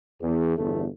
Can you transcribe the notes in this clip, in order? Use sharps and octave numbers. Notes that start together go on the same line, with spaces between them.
E2
G1 E2 A3